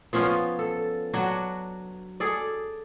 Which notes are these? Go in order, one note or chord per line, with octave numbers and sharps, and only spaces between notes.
F3 B3 C#4 F4
A4
F#3 D4 F#4
G#4 A4 D5